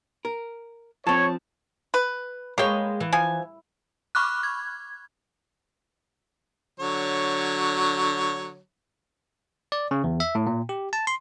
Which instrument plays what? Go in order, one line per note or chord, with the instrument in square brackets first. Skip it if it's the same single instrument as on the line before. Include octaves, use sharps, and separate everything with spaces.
[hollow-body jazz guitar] A#4
[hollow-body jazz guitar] F3 C4 [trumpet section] C#5 [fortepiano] A5
[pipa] B4
[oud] G#3 B4 C#5 [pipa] A#3 G5
[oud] E3
[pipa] F3 G#5
[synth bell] B5 C#6 D6 F6 F#6
G#6
[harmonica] D3 F#3 C#5
[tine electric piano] D5
C#3
E2
E5
A2
A#2
G4
A5
C6